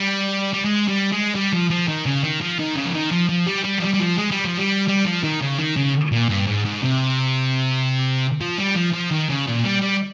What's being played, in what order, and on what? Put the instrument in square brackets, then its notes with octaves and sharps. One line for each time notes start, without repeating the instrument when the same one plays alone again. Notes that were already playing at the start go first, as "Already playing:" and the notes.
Already playing: [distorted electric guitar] G3
G3
G#3
G3
G#3
G3
F3
F3
D#3
C#3
D#3
F3
D#3
C#3
F3
D#3
F3
F3
G3
G3
F3
G3
G3
F3
G#3
G3
F3
G3
G3
F3
D#3
C#3
D#3
C#3
A#2
G2
G#2
G#2
C3
F3
G3
F3
F3
D#3
C#3
A#2
G3
G3